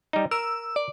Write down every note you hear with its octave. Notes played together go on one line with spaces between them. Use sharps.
G3 D#4
A#4 E6
D5